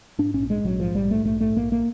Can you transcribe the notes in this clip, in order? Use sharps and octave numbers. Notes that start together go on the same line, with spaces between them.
G#2 D4
A#1 C#4
G#2 G#3
A#1 F#3
G#2 F3
A#1 G3
G#2 A3
A#1 A3
G#2 A3
A#1 A#3
A#3